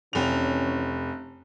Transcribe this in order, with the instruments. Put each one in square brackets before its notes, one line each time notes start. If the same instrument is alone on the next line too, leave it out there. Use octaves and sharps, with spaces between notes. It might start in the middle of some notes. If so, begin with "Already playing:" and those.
[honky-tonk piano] F1 F7 [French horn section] E3 C#4